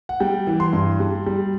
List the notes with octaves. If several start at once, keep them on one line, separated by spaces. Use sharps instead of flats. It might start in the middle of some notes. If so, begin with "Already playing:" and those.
F#5
G3 G5
E3
C6
G2
G3
G3